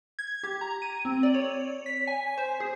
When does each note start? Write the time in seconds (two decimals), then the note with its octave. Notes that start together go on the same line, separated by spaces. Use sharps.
0.19 G#6
0.43 G4
0.61 A#5
0.82 D#7
1.05 C4
1.23 D5
1.34 C#5
1.86 B6
2.07 G#5
2.38 C5
2.60 G#4